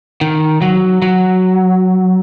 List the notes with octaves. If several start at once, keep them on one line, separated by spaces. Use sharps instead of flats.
D#3
F#3
F#3